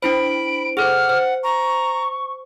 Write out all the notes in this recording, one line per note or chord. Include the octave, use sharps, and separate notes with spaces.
D4 E4 C5 B5 D7
G#4 A4 C5 F#5 F6
C5
A#5 C#6